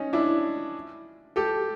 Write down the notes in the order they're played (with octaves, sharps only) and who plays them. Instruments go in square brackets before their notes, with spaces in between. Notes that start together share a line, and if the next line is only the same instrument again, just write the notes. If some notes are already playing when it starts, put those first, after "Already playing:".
Already playing: [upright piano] C#4 D#4
D4 E4
G4 A4